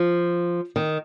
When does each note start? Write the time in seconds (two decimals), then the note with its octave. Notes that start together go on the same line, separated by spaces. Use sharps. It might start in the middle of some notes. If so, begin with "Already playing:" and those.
Already playing: F3
0.76 D#3